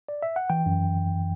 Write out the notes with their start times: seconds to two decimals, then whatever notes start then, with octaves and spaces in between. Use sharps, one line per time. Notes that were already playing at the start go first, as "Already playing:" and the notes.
0.09 D5
0.22 E5
0.36 F#5
0.50 E3 G5
0.66 F#2